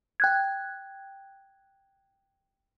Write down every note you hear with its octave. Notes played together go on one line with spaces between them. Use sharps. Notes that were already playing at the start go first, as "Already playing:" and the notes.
G5 F#6 G#6